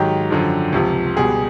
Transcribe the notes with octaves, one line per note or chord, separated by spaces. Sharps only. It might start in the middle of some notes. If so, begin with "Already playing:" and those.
Already playing: G#2 D#3 F#3 G4
F#2 D3 F3
C#2 C3 F3
C#2 B2 G3 G#4